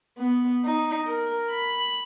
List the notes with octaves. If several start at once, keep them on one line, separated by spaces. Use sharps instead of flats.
B3
D#4
A#4
B5